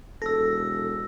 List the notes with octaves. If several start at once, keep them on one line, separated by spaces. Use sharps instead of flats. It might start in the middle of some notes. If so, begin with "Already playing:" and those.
E1 A4 E6 A#6